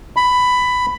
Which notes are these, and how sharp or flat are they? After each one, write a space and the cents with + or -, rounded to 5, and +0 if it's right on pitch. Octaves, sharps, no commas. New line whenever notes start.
B5 +10